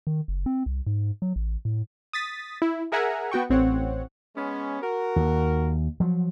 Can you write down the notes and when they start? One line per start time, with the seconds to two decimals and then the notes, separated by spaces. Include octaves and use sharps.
0.07 D#3
0.28 F#1
0.46 C4
0.66 C2
0.87 G#2
1.22 F#3
1.36 A1
1.65 A2
2.13 D#6 A6 B6
2.62 E4
2.92 G#4 A#4 E5 F#5 G#5 A#5
3.31 B3 F#4 G5 C#6
3.49 A1 C4 C#5 F#5
4.35 G#3 B3 C#4
4.81 F#4 A#4
5.16 D#2
6.00 F3 F#3